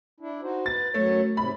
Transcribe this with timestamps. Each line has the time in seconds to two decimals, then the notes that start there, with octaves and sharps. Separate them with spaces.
0.20 D4 E4
0.42 D#4 F#4 C5
0.66 B4 A6
0.94 F#2 F#3 A3 C#5
1.37 G#2 C3 B5